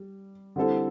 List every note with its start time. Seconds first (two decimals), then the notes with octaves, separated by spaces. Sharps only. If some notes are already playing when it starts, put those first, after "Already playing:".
Already playing: G3
0.56 D3 G3 C4 E4 A4